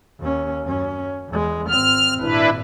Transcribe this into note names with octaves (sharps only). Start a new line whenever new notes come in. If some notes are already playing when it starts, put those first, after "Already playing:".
D#2 C#4
F#2 C#4
E2 G#3
G#1 C4 F6
G#1 A#2 D4 E4 B4